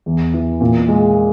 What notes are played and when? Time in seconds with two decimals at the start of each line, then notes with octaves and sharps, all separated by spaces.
0.06 E2
0.34 E3
0.61 A#2
0.88 G#3